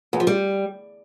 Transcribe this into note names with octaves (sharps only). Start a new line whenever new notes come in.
E2
F3
G3